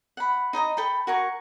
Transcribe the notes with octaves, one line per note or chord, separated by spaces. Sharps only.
F#5 B5
D#4 D#5 G#5 A#5
A4 G5 B5
F#4 A#4 G#5 C#6